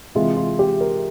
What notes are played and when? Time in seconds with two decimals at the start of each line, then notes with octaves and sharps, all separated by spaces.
0.15 C3 E3 G#3 F4
0.37 F4
0.59 G4
0.81 A#4